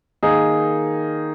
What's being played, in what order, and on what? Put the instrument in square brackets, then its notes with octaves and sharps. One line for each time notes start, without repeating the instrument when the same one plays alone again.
[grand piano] D#3 A#3 D#4 G#4